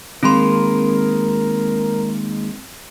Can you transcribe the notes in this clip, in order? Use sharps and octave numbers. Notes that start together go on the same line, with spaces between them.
D#3 G#3 A#3 C4 A#4 B5 C6